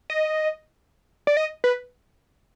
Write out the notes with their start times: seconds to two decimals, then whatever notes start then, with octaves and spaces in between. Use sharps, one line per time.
0.10 D#5
1.27 D5
1.37 D#5
1.64 B4